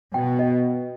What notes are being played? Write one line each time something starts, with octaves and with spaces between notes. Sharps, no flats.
B2 G5
D#5